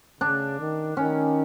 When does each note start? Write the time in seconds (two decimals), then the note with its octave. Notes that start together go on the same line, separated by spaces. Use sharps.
0.20 C#3 D4
0.59 D#3
0.97 D#3 C#4